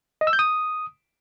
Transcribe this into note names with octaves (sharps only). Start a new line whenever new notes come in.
D#5
E6
G6
D#6